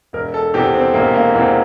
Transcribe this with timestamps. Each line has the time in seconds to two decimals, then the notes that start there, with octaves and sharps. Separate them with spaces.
0.13 E1 A#4
0.34 A4
0.54 E2 C3 G4
0.74 C4
0.94 E1 A#3
1.14 A#3
1.34 E2 C3 C4